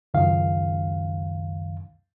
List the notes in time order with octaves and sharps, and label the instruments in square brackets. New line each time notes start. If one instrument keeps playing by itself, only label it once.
[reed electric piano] C#2 F#2 D#3 F5